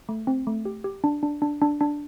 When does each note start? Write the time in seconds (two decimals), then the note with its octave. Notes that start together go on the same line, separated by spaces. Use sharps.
0.09 A3
0.27 C4
0.47 A3
0.65 G4
0.84 G4
1.04 D4
1.23 D4
1.42 D4
1.62 D4
1.81 D4